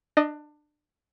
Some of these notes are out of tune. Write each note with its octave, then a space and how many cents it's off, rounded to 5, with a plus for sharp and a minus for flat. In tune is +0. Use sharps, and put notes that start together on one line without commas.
D4 +25 D#5 +0